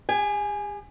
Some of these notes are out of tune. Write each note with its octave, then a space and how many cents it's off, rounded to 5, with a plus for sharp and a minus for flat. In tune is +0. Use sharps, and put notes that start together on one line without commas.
G4 +45 G#5 +0